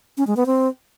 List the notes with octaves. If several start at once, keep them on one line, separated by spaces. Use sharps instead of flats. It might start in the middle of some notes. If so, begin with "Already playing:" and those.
C#4
G#3
B3
C4